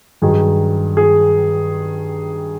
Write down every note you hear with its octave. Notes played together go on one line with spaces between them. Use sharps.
G2 D#3 F#3 G#4
G#4